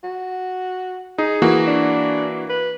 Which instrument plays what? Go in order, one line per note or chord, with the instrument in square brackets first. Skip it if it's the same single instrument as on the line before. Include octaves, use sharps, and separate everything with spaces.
[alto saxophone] F#4
[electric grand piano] D#4 [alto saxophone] G#4
[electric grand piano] E3 A#3 F#4
[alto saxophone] D4
B4